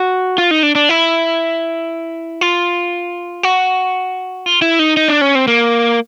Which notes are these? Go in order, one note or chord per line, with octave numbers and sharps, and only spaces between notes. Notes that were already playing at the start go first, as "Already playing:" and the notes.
Already playing: F#4
F4
D#4
D4
D4
E4
F4
F#4
F4
E4
D#4
D#4
D4
C#4
C4
A#3